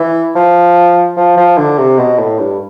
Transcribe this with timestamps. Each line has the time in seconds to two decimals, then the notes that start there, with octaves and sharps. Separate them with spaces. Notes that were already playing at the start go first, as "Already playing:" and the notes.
Already playing: E3
0.35 F3
1.17 F3
1.37 F3
1.58 D3
1.78 C3
1.98 B2
2.19 A2
2.39 G2